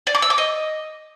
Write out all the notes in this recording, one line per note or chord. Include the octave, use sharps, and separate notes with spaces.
D5
D6
E6
D6
D#5